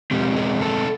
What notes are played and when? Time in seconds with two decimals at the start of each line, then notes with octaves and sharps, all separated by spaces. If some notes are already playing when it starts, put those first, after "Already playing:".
0.11 B2 G#3 C4 G4
0.36 G#4
0.61 A4